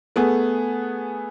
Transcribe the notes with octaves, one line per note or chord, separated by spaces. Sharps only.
A3 B3 G#4